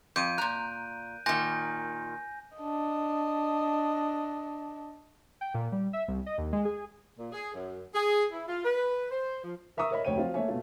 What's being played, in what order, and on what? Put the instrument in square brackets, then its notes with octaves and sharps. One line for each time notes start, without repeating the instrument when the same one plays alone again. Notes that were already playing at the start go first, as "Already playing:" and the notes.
[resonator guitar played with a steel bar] F2 [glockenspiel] G6 D7 D#7
[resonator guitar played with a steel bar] A#2 A#5 [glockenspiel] F#6
[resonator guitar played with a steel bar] A#2 D#3 [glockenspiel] G#5 G6 A#6
[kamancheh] D4 D#5
[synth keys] G5
A#2
G3
E5
C2
D#5
D#2
G#3
G#4
[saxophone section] A#2
G#4
F#2
G#4
E4
F4
B4
C5
F3
[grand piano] A#4 E5 A#5 C#6 D#6 E6
A#4 C#5 D#5 E5 B5
F1 D2 C#5 G5 D#7
F3 F#3 C4 F4
A3 A#3 C#5 E5 G#5
B2 A3 F4